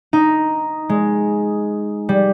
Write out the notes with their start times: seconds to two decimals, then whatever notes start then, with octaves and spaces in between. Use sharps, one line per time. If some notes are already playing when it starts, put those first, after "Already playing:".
0.13 D#4
0.89 G#3
2.09 G3